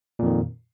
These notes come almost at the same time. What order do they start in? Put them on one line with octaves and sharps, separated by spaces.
A#2 F2 D#3